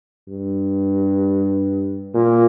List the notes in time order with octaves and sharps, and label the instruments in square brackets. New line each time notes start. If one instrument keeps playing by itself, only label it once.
[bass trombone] G2
A#2